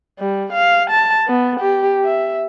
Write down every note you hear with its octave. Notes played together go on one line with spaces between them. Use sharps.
G3
F5
A5
B3
G4
E5